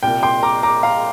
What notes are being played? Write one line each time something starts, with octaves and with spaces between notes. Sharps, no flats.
C2 A#2 G5
G5 C6
A#5 D6
A#5 D6
F5 A#5